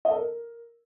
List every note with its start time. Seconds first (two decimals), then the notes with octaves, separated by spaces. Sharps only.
0.05 D#5
0.10 A4
0.15 A#4